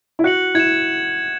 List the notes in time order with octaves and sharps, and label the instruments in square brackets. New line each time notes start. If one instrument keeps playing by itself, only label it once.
[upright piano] E4
[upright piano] F#4 [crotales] F#6 C#7 F#7
[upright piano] E4 [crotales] G#6 C#7 E7